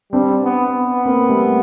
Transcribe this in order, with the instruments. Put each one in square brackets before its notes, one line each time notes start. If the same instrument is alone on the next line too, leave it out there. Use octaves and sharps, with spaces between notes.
[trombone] G3 [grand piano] C4 D4
[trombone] B3
B3
[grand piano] A#3 C4
G3 A3